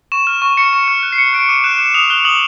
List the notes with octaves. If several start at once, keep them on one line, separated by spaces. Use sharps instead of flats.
C#6 E7
F6 E7
C#6
C#6 C#7
C#6
F6
F#6
C7
F#6 C#7
F#6 D7
D6 D#7
F#6 E7
F#6 E7
D#6 F7
F#6 G7
D#6 F#7